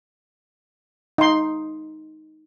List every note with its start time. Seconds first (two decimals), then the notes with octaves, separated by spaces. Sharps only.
1.18 D#4 C6